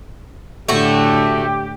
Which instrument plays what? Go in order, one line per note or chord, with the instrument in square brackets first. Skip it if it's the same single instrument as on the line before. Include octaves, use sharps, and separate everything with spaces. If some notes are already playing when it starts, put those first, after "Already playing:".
[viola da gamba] A2 D3 [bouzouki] A3 F#4 [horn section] G4